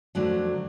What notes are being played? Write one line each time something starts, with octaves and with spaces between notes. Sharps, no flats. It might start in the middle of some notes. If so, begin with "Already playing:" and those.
F2 D3 F#3 A3